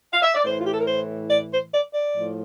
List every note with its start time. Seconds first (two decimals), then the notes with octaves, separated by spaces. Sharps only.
0.12 F5
0.22 E5
0.34 D5
0.44 A2 E3 C5
0.59 F4
0.65 G4
0.73 A4
0.80 A#4
0.87 C5
1.30 D5
1.51 C5
1.72 D5
1.94 D5
2.15 A2 F3